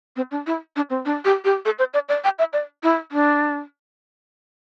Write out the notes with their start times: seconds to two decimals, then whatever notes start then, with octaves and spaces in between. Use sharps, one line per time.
0.16 C4
0.31 D4
0.47 E4
0.76 D4
0.90 C4
1.05 D4
1.25 G4
1.45 G4
1.65 A4
1.79 C5
1.94 D5
2.09 D5
2.24 G5
2.39 E5
2.53 D5
2.83 E4
3.12 D4